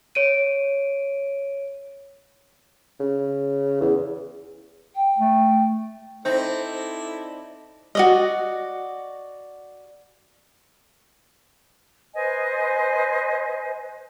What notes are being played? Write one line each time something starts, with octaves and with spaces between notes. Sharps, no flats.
C#5 D7 D#7
C#3
E2
G5
A3
C4 D#4 E4 A4 C5 D5 G6
F#4 D5 D#5
B4 C5 D#5 G#5